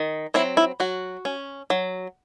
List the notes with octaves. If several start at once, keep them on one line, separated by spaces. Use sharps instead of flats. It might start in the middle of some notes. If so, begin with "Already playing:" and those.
Already playing: D#3
F#3 C4 E4
E4
F#3 F#4
C#4
F#3